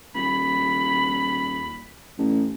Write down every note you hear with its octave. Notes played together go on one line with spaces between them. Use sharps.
D#1 B5
A1